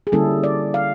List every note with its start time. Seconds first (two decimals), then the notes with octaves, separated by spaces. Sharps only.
0.07 G#4
0.12 D3 G3 A#3 C#4 E4 A4
0.44 D5
0.74 F5